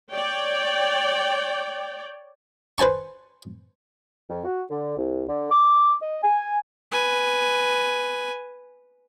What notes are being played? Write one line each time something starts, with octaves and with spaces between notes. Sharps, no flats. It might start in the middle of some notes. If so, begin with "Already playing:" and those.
C#5 D5 G5
B4 C5 G#5 A5 C#6
F2
F#4
D3
C2
D3
D6
D#5
G#5
B4 G#5